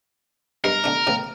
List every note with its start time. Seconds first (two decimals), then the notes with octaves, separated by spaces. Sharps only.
0.64 G2 G#3 A#4
0.84 D3 A3 D4
1.07 A2 C#3 E3